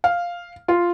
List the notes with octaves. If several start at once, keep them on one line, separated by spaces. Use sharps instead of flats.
F5
F4